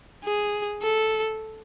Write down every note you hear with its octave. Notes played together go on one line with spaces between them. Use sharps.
G#4
A4